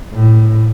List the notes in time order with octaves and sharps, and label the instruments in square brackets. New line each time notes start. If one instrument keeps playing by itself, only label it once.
[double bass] A2